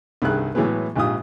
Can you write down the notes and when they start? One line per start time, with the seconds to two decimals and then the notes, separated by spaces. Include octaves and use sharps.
0.22 C2 G2 D#3 G#4 F#6
0.55 A2 E3 F#3 G#3 B3
0.96 A#1 G#2 D#4 F4 G4 D#6